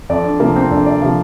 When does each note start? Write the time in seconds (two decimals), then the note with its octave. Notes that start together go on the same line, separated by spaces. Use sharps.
0.10 F2 D5
0.24 D4
0.40 C3 F3 A#3
0.56 C4
0.71 F2 D4
0.86 D5
1.02 C3 F3 F5